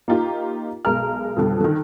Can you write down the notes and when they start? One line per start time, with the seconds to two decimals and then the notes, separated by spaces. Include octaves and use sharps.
0.08 A#3 D#4 F4 G4
0.85 B1 G#3 A#4 F6
1.36 F2 B2 D3 G3
1.60 D3 D#3